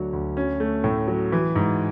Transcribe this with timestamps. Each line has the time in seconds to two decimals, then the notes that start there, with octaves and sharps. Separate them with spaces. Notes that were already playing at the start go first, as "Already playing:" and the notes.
Already playing: D2 D3 F#3
0.13 D2
0.37 C#4
0.60 A3
0.84 A2
1.08 F#3
1.32 E3
1.55 G#2